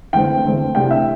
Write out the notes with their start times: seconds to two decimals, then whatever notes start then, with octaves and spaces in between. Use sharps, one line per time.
0.13 E2 D3 A3 C4 G5
0.44 E2 D3 A3 C4
0.74 C2 C3 A3 D4 G5
0.91 E5